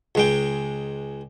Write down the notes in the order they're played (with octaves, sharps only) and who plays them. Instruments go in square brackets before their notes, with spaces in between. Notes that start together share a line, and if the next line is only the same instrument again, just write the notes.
[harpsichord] C#2 G#3 G5